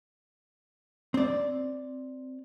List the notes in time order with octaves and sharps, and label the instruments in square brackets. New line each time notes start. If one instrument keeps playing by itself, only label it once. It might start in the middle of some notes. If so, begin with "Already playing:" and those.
[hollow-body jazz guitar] C4 D5